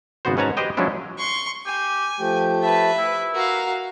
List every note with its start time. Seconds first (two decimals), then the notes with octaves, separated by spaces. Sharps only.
0.25 G#1 C#3 B3 F#4 C5
0.37 G#2 C#4 B4 C#5 A5 A#5
0.57 G4 B4 C5 D#5 G5
0.77 F3 F#3 G#3 C#4 D4 E4
1.18 C6 C#6
1.66 G4 G#5
2.19 F3 A3 G4 G5
2.62 B4 E5 A5
2.98 E4
3.34 F#4 A#4 F5